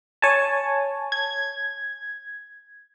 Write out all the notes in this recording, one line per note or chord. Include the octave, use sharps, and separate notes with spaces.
C#5 G#5 A5
G#6